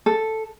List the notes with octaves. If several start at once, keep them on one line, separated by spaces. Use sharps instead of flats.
A4